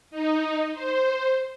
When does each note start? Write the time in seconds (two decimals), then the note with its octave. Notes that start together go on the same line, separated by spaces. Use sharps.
0.11 D#4
0.73 C5